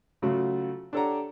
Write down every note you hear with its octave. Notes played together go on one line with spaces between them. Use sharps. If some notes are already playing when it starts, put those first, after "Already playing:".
C#3 F#3 A3 F4 F#4
D4 G4 A4 C#5 F#5 A#5